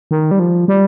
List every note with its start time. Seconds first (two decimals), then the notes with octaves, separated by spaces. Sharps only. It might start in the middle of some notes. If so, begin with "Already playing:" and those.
0.11 D#3
0.31 G3
0.39 F3
0.68 G3